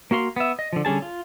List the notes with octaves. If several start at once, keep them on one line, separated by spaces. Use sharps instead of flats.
A#3 F#4 F5 C6
B3 E5
D#5
D3 F3
D3 G3 C#4 G#4 A5
F4